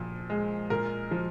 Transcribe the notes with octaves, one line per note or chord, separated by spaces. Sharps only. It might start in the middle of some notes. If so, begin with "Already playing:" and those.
Already playing: A#2 F3
G#3
A#2 A#4
F3